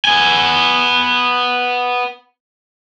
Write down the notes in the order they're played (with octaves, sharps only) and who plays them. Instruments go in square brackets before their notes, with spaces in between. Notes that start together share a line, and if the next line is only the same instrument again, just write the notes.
[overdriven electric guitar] B3 G#5